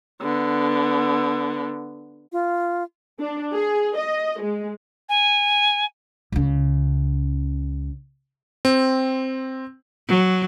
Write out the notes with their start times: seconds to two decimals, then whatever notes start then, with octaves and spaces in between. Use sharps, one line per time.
0.22 D3 B3
2.32 F4
3.20 D4
3.54 G#4
3.98 D#5
4.42 G#3
5.09 G#5
6.32 C#2 C#3
8.65 C4
10.08 F#3